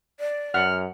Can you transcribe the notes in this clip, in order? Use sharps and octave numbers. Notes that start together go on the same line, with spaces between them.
D5
F#2 F#5 F6